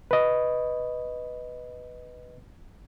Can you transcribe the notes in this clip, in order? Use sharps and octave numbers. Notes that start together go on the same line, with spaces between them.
B4 D#5